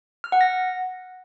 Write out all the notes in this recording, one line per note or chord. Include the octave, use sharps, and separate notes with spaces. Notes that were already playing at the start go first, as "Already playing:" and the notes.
F6
F#5
A#6